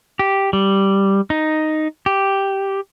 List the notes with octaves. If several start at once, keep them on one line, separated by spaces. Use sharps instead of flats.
G4
G3
D#4
G4